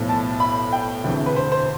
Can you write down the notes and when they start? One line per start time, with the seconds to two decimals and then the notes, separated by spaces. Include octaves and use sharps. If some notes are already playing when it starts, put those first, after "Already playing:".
Already playing: B1 A2 F3 B3
0.09 A5
0.40 B5
0.73 G5
1.04 E1 D2 C3 E3
1.26 B4
1.36 C5
1.52 C5